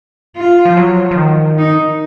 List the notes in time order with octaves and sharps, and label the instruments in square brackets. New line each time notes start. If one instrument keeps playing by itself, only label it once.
[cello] F4
[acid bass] F3
F#3
F3
D#3
[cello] D#4